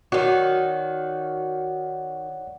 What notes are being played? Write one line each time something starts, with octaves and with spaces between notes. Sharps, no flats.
D#3 F#4 C#5 D5 F#5